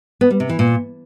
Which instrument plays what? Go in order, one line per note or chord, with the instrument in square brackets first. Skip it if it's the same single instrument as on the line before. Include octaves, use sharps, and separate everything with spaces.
[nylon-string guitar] B3
G3
C3
E3
A#2